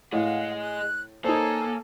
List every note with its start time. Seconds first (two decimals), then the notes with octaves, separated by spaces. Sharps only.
0.12 A2 G#4 D#5 F5 F#5
0.62 F#6
1.24 A#3 D#4 A4 C5 C#5 G#5